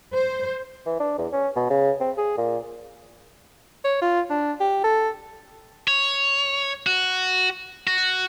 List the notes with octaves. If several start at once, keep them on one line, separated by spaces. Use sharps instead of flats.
C5
E3
D4
E2
C#4
B2
C#3
C4
G#4
A#2
C#5
F4
D4
G4
A4
C#5
F#4
F#4